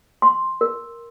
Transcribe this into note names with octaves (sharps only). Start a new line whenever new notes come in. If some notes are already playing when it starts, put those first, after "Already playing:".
C6
A#4